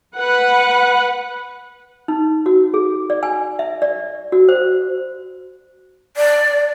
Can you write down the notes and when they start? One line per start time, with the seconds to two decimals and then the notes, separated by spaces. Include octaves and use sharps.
0.15 B4 F#5
2.08 D#4
2.46 F#4
2.74 G#4
3.10 D5
3.23 G#5
3.59 E5
3.82 D5
4.32 F#4
4.49 C5
6.17 D5